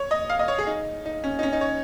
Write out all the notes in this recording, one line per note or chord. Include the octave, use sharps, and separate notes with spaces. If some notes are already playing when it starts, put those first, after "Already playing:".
Already playing: C#5
D#5
F5
D#5
C#5
G#4
D#4
D#4
C#4
D#4
C#4
D#4
C#5